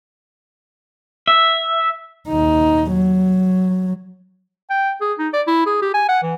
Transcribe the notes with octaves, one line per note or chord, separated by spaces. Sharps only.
E5
D#2 D#4
F#3
G5
G#4
D#4
D5
E4
G#4
G4
G#5
F#5
E3